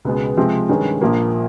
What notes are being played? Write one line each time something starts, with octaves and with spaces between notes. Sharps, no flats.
C#2 B2 G#3 B3
C3 F3 G#3 C4
G2 D#3 G#3 C#4
A#1 A#2 F3 A#3